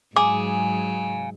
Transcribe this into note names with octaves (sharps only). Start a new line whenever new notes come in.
G#2 F#3 G#4 F5 G#5 D6